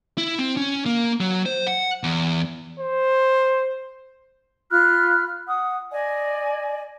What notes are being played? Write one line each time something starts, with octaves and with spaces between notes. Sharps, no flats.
E4
C4
C#4
A#3
F#3
C5
F#5
E2
C5
F4 B5 F6 F#6
F#5 D#6
D5 D#5 G#5